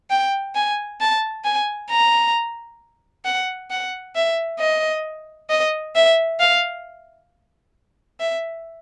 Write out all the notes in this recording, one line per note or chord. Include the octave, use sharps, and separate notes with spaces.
G5
G#5
A5
G#5
A#5
F#5
F#5
E5
D#5
D#5
E5
F5
E5